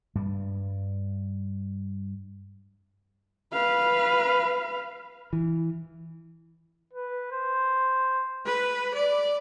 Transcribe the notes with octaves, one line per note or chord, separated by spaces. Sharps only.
G2 G3
B4 F5
E3
B4
C5
B4
D5